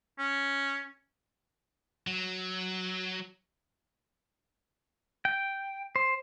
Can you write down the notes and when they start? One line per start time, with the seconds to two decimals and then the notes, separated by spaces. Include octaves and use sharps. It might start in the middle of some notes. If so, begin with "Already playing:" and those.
0.19 C#4
2.07 F#3
5.25 G5
5.96 C5